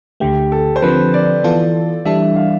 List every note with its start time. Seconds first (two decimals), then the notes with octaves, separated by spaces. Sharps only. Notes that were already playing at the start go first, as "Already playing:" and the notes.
0.20 D2 D3 A3 G4
0.52 A4
0.76 C5
0.82 D3 F3 C4 B4
1.14 D5
1.44 E3 B3 F4 A4
2.05 E3 G3 D4 A4 E5
2.36 F5